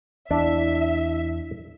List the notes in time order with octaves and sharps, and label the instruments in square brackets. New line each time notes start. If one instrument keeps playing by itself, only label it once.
[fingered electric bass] E2 [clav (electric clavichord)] D4 [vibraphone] E4 D#5 E6 [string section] E5